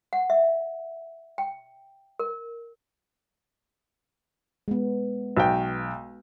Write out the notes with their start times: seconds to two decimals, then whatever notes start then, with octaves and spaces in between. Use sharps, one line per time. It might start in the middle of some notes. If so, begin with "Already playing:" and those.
0.13 F#5
0.30 E5
1.38 G5
2.20 A#4
4.68 G#3 B3
5.37 B1 G5